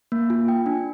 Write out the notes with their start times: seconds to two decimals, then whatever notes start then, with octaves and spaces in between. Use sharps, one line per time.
0.12 A#3
0.30 F4
0.48 G5
0.66 D4